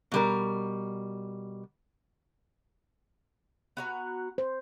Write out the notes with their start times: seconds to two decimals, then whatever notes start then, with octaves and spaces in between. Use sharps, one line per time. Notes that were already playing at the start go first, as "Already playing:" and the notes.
0.12 B2 G3 A#4
3.77 B3 F#4 A#5
4.38 C5